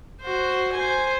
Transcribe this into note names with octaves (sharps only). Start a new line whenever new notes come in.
F#4 C5
C5 G#5